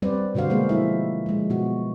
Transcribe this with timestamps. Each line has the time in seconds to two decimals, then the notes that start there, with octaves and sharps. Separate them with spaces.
0.02 G3 C4 B4 C5 D5
0.35 B2 D3 F#4 C5 F5
0.50 G#3 A#3 G#4 C5
0.69 F3 E4 E5
1.26 F3 G#3
1.50 B2 B3 F#4